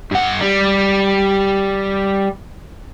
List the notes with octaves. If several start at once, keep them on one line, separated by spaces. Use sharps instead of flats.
G2 F#5
G3